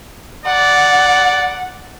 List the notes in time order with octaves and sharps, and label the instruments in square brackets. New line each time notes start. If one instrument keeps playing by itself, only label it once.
[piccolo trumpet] D5 [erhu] F#5